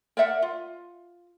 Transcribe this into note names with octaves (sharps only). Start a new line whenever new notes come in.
A#4 D5 E5 F#5
F4